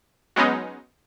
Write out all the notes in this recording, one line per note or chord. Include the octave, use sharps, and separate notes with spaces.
F#3 G#3 B3 C#4 D#4